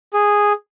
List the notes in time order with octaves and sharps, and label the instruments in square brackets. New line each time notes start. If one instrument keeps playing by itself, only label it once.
[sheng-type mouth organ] G#4